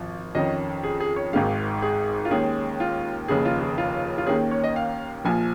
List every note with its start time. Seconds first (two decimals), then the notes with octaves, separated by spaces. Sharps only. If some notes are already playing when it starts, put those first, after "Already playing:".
Already playing: G#1 F3
0.35 F2 D#3 C#4 D#5
0.83 G#4
1.00 G#4
1.16 C#5
1.33 G#1 G#2 D#3 G#3 F5
1.82 G#4
2.25 F4
2.31 D#2 D#3 G#3 C#4 G#4
2.80 F4
3.28 F1 D#2 C#3 G#4
3.45 F4
3.61 G#4
3.78 F4
4.18 F4
4.27 D#2 D#3 A#3 C#4 G#4
4.51 C#5
4.64 D#5
4.76 F5
5.25 A#1 A#2 F3 G#5